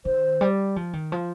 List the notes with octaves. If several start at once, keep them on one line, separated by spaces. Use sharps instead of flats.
D#3 C5
G3
F3
D#3
F3